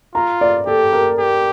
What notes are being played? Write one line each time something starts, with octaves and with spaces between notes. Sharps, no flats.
F4 A#5
D5
G4 A4
A#4
G4